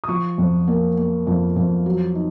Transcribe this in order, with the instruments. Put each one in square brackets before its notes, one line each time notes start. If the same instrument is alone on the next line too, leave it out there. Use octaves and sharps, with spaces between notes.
[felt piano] D#6
F3 C#6
F2
A#3
A#3
F2
F2
F#3
D#4